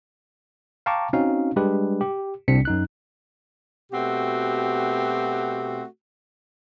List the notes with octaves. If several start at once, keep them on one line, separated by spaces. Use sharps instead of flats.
F5 G5 A5 A#5 C#6 D6
C4 C#4 D#4 F#4 F5
G3 G#3 D4 G4 B4
G4
C2 C3 C4 D4 B6 C#7
F#2 D#4 F#6
B2 A3 C4 F#4 G4